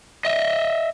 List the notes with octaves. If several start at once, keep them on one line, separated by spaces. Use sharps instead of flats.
D#5 E5